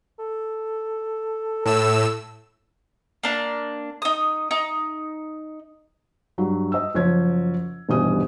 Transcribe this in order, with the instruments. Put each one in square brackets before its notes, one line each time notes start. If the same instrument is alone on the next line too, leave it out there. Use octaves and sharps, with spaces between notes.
[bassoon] A4
[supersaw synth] A2 E6 [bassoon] A4
[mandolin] A#3 D4
D#4 D#6
D#4
[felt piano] G2 F#3
D#5 E6
F#1 F3 C#5 G#6
D#1 G2 B2 E3 D#6